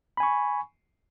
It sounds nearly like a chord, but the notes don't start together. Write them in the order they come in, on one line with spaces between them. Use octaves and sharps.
B5 G#5 C#6